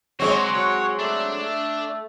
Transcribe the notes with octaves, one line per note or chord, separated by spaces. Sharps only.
D3 F#3 G#3 C4 F#4 C#5
F#4 C#5
A3 D4
A3